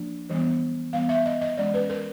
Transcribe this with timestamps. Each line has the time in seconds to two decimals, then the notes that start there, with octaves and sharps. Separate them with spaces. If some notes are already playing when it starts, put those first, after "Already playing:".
Already playing: F3 A#3 D4
0.30 E3 G3 B3
0.93 E3 G3 B3 F5
1.09 E5
1.26 D#5
1.41 D#5
1.57 E3 G#3 C#4 D5
1.74 B4
1.90 A#4